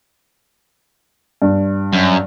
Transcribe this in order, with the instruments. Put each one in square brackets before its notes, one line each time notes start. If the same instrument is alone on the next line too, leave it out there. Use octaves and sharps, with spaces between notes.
[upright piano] G2
[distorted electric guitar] F#2